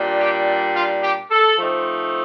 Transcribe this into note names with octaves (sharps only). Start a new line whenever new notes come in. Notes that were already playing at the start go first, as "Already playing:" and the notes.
Already playing: A#2 G3 D4
G4
F4
G4
A4
F3 A3 C4 D#4